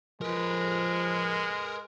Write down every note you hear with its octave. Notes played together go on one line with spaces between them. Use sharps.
F3 G#3 A#4 B4